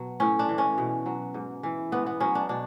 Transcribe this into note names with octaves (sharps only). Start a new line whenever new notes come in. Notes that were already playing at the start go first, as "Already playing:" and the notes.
Already playing: B2 F#3
A2 C#4
D4
E3
C#4
B2
F#3
G#2
E3
G#2 B3
B3
F#3 C#4
D4
B2 D4